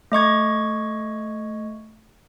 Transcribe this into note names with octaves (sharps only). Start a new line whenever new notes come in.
A3 D#5 C#6 G#6